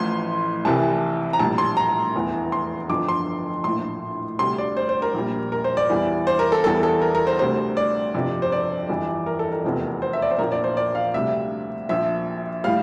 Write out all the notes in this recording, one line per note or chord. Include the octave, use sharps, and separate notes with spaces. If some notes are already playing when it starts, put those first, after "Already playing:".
Already playing: A1 A2 F3 C6
C2 C3 E3 G3 A5
A#5
A#1 A2 G3 A5
C6
A#5
F1 E2 E3
C6
G1 F2 D3 F3 D6
C6
A#1 A2 F3 C6
D2 C3 G3 C6
D5
C5
C5
A#4
A#1 A#2 G3
A#4
C5
D5
E2 E3 G3
C5
A#4
A4
E2 E3 G3 A4
A4
A#4
A#4
C5
D2 C3 G3 C5
D5
G1 F2 C3 F3
C5
D5
G1 F2 E3 G3
A#4
A4
A#4
F1 E2 C3 F3
C5
E5
D5
C5
A#1 A#2 F3 A#4
D5
C5
D5
F5
D2 C3 G3 E5
A#1 A#2 F3 E5
A2 G3 F5